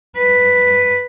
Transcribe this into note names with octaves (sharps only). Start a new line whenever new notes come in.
B4